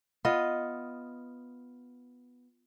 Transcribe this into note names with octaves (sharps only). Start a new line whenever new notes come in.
B3 F4 D#5